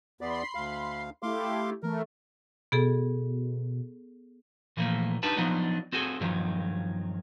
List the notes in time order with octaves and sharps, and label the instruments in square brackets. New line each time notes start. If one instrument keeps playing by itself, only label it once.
[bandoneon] E2 B3 D5 [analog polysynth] B5 C6 C7
[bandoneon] D2 F5
[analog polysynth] A3 E4 G4 [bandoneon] F5 C6 D6
[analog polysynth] E3 A3 [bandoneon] A#4
[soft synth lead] B2 [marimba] B3 G#4 A4
[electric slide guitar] A#2 E3 F3 A3 A#3
D4 D#4 G4 B4 A5
F3 F#3 B3 D4 D#4
C4 F#4 G#4 A4
G2 D#3 F3 F#3